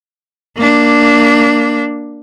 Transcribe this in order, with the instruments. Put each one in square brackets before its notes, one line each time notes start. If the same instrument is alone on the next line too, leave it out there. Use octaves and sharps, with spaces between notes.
[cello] A#3 D4